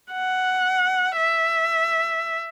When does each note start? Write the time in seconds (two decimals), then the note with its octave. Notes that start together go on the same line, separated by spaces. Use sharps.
0.12 F#5
1.16 E5